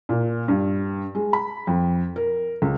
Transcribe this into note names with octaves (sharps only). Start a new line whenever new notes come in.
A#2
G2
G#3
B5
F2
A#4
C#2